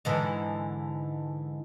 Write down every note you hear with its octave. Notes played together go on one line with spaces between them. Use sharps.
G#2 D3 E3